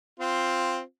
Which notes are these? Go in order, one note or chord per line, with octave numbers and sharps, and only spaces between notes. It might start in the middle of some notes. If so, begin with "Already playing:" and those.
C4 F4